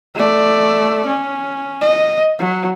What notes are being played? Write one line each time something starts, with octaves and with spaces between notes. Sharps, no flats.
A3 D5
C#4
D#5
F#3